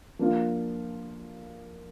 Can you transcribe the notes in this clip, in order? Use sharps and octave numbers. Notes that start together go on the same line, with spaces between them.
F3 A#3 D4 F4